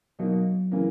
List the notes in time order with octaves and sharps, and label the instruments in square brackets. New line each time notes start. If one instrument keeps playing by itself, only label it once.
[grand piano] B2 A#3 D#4 [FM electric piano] F#3
[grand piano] C#3 E3 A#3